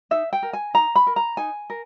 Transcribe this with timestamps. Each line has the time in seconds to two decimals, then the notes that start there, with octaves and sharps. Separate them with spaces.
0.11 D#4 E5
0.33 G5
0.43 A#4
0.53 G#5
0.74 D#4 A#5
0.96 B5
1.07 A#4
1.16 A#5
1.37 D#4 G#5
1.70 A#4